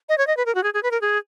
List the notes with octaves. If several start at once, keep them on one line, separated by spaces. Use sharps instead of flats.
D#5
C#5
D#5
B4
A#4
F#4
G#4
G#4
B4
A#4
G#4